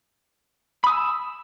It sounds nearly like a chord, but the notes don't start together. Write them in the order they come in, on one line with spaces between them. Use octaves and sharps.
B5 D#6 G#5 E6